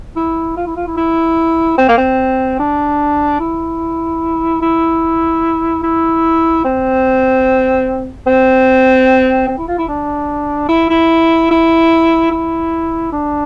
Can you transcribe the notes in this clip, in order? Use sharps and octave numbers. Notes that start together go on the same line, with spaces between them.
E4
F4
E4
F4
E4
E4
C4
A#3
C4
D4
E4
E4
E4
C4
C4
C4
E4
F4
E4
D4
E4
E4
E4
E4
D4